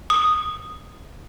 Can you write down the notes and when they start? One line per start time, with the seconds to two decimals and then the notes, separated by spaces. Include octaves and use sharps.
0.10 D#6